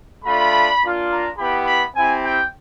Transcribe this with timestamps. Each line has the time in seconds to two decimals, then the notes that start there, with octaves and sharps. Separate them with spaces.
0.24 A3 D4 F4 B5
0.82 A#3 D4 F4
1.10 A#5
1.38 B3 E4 G4 B5
1.66 B5
1.95 C4 E4 G4 G#5
2.23 G5